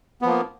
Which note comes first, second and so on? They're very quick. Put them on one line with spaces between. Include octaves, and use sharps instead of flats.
B3 F3 A#3